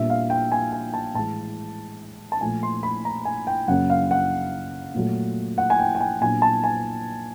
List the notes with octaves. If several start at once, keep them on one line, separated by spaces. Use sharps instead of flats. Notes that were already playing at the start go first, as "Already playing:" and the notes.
Already playing: A#2 G3 B3 D4 E5
F5
G5
G#5
G#5
A5
A2 E3 G#3 A5
A5
A#2 F3 A3 G#5
C6
B5
A#5
G#5
G5
F#2 C#3 F#3 A#3 C#4 F#5
F5
F#5
A#2 F#3 A3
F#5
G#5
G5
G5
G#5
A#2 F#3 B3 D4 G#5
A5
G#5